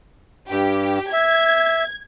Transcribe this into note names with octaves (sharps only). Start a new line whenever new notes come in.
G2 G4
E5 G#6